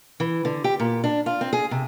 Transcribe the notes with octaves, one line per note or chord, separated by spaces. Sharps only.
E3
D3
G4
A#2
D4
F4
C4
G#4
C3